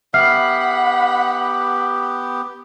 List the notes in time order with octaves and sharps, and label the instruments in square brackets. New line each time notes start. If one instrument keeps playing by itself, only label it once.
[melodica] B3 G4 [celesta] E5 F6 C7 [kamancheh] F#5 B5